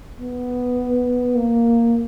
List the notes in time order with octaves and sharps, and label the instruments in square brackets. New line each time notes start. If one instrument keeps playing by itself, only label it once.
[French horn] B3
A#3